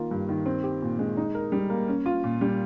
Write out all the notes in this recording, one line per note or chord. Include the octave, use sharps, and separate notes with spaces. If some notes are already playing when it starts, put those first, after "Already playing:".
Already playing: D#3 A#3 F4
G2
D#3
C4
G4
A#2
G#3
D#4
A#4
G3
A#3
C#4
F4
A#2
G3